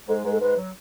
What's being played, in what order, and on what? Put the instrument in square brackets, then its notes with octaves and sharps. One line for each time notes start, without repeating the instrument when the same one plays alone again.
[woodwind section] G#2 G#3 [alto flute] A4
[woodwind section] G#2 G#3 [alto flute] B4
[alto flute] A4
[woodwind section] G#2 G#3 [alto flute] B4
[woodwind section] F#3